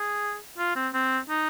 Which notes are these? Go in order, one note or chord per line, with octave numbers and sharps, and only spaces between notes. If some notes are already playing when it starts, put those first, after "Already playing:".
Already playing: G#4
F4
C4
C4
D#4